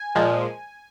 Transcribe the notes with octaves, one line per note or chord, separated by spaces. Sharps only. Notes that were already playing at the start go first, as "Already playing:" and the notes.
Already playing: G#5
A#2 F3 G#3